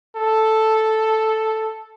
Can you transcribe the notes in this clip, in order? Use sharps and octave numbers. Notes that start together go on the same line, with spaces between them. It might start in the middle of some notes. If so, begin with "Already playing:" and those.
A4